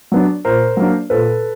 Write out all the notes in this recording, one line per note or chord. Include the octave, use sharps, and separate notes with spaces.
F#3 B3 D4
A#2 A#4 C5
F#3 A#3 D4
A#2 A4 B4